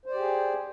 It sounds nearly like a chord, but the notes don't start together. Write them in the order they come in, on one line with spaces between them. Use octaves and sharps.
C5 D5 G4 G#4